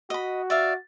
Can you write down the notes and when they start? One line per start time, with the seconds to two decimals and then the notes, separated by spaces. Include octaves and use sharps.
0.10 F#4 D#5 B5
0.50 D5 E5 F5